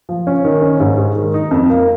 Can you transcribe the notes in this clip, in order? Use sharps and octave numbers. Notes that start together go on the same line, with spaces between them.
F3
C#4
D#3
C#4
G#2
G#3
D#3
D#4
F2
A#3